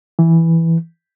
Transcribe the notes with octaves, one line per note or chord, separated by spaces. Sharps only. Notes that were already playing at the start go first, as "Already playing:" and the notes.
E3